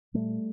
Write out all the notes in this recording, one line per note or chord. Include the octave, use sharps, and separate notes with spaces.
A#2 G3 A3